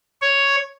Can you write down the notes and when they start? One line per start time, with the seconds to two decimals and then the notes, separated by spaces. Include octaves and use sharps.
0.22 C#5